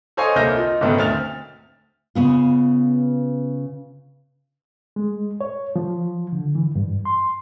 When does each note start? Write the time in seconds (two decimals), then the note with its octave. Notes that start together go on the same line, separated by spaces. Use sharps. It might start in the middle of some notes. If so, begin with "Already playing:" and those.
0.17 A4 C5 C#5 D#5 F5 G#5
0.36 C2 A#3 A4 F6 G6 A#6
0.52 D#4 F4
0.81 F#1 G#2 B2 D#3 A4 B4
0.98 D2 C4 F6 A6 F7
2.15 C#3 B3 F4
4.96 G#3
5.41 C#5
5.76 F3
6.32 D3
6.55 E3
6.75 G2
7.05 C6